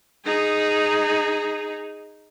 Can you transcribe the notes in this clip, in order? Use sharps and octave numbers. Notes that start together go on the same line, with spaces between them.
D#4 G#4